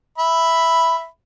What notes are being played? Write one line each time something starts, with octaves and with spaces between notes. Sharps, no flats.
E5 B5